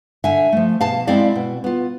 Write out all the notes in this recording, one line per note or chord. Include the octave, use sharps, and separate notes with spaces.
D3 E5 G#5
F3 A3
B2 F5 A5
G#3 C4 E4 D5 F5
B2
B3 F4